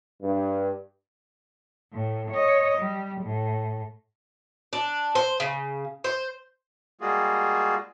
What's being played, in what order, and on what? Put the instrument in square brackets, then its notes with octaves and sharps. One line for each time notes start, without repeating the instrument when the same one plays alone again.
[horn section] G2
[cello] A2
C#5 D#5
G3
A2
[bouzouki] D4
C5
C#3
C5
[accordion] G3 G#3 A#3 F4 F#4 G#4